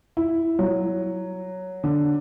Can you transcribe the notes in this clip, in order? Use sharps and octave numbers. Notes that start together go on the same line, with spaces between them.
E4
F#3
D3